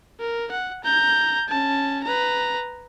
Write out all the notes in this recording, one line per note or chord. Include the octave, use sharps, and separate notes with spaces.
A#4
F#5
A#5 G6
C#4 A5
B4 A#5